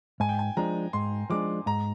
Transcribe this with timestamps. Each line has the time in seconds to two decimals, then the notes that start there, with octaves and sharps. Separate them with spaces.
0.20 G#2 G#5
0.29 G5
0.39 G#5
0.57 F3 G#3 D4 A#5
0.93 G#2 C6
1.30 F3 G#3 D4 D6
1.66 G#2 A#5